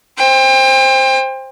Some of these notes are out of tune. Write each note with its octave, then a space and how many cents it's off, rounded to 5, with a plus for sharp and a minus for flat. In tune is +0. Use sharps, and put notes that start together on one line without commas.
C5 +10 G5 +35